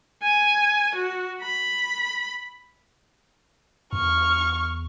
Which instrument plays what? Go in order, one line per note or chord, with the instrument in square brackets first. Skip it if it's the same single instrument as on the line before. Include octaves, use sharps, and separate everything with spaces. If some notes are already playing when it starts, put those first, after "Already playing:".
[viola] G#5
F#4
B5
[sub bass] E2 [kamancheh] C#6 F6